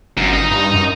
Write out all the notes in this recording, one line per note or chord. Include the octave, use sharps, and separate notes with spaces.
G1 F#2
D#5 A#5
G2
F#2